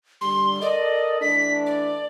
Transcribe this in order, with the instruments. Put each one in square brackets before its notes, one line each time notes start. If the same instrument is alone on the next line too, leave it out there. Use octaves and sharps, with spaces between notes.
[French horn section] D3 G3 [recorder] C6
[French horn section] A4 A#4 D#5 [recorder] D5
[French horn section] E3 A3 D4 [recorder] B6
[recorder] D5